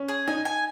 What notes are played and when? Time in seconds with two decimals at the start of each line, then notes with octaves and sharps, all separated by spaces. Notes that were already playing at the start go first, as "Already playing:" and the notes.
Already playing: C#4
0.09 G#4
0.28 D#4 G#5
0.45 G#5